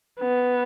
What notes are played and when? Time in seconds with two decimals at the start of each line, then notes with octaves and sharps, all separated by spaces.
0.19 B3